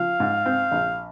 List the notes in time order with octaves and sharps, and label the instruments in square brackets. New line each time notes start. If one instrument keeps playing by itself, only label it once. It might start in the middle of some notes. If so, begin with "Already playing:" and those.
Already playing: [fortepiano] F3 [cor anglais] F5
[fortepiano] G#2
C4
A#1